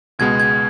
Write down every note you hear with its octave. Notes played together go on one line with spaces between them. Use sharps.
C#2 B2 G#3 B3 G#6
G#6